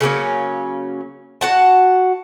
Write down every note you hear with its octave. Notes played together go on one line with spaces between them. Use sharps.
C#3 F#3 A#3 C#4
F#4 F#5 A5